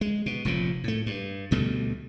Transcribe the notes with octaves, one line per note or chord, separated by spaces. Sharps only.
G#3
B2
F1 A#2 C#3 F3
A2 A3
G2
D2 B2 G3 A3